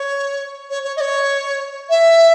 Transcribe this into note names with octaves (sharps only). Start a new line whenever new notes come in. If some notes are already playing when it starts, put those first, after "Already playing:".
Already playing: C#5
C#5
C#5
D#5
C#5
E5